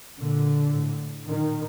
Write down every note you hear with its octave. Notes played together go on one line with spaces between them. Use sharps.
A#2 D3
A2
A#2 D#3